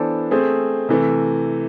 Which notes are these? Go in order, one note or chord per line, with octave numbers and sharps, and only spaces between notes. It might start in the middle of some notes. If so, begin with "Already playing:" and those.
Already playing: E3 B3 D4 A4 C5
A3 C4 G#4 C5
C3 E3 A3